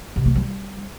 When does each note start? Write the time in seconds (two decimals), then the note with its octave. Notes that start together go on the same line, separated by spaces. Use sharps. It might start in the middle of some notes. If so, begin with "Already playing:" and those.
0.16 C3
0.26 A#3
0.35 G3